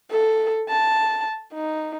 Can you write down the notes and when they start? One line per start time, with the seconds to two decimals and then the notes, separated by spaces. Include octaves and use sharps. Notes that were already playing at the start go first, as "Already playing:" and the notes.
0.11 A4
0.69 A5
1.54 D#4